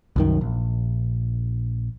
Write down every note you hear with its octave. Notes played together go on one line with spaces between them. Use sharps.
C2 F#2 D#3
A#1